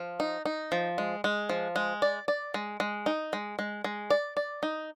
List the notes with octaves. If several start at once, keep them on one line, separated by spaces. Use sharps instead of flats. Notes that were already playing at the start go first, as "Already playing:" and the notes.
Already playing: F3
D#4
D#4
F3
G#3
G#3
F3
G#3
D5
D5
G#3
G#3
D#4
G#3
G#3
G#3
D5
D5
D#4